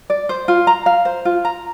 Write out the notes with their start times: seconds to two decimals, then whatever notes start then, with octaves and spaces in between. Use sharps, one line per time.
0.10 D5
0.29 C5
0.48 F4
0.67 A#5
0.86 F5
1.05 C5
1.25 F4
1.45 A#5